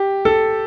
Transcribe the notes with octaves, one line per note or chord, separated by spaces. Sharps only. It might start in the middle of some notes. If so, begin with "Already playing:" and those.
Already playing: G4
A4